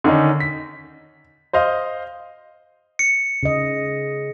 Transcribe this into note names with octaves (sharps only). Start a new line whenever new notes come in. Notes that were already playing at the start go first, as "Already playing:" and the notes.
D3 D#3 C#4 D#4
B6
C5 D#5 F5
C#7
C#3 D#5